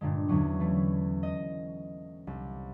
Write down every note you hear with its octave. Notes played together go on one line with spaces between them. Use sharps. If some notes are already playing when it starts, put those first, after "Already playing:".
G2 A#2 D3 G#3
E2 D3 F#3 C#4
E3 A3
D#5
C2